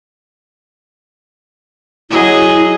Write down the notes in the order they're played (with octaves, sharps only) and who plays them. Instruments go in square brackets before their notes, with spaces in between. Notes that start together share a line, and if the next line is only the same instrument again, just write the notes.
[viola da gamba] F#3 G#4 D#5 [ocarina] E4